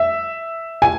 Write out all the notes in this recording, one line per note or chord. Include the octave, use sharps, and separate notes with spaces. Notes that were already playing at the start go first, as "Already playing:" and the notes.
Already playing: E5
G#5